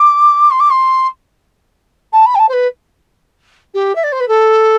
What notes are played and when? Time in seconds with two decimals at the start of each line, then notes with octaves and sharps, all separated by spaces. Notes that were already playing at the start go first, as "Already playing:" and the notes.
Already playing: D6
0.50 C6
0.60 D6
0.70 C6
2.13 A5
2.26 B5
2.35 G5
2.39 A5
2.49 C5
2.53 B4
3.74 G4
3.95 E5
4.03 D5
4.12 C5
4.20 B4
4.28 A4